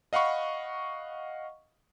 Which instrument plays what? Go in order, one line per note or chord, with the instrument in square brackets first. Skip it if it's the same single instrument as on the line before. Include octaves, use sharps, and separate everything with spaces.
[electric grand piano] D#5 F5 F#5 B5 C#6